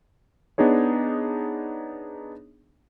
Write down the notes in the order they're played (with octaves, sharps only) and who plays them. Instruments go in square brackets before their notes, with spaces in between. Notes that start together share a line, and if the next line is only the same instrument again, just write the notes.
[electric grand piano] B3 D4 D#4 G#4 C#5